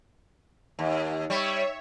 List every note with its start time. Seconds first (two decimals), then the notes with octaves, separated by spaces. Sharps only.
0.79 D#2
1.30 G3 C#5 E5